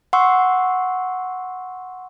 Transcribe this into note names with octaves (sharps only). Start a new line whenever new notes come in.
F#5 C6 C#6 E6